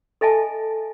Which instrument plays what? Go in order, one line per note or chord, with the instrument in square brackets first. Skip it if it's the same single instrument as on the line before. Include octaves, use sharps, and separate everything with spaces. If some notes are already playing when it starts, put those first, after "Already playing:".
[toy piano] A4 D#5 E5 G#5 A5